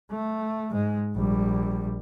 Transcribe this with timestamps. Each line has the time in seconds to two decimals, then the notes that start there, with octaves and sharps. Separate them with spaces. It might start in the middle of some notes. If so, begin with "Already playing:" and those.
0.11 A3
0.70 G#2 G#3
1.15 A#1 G3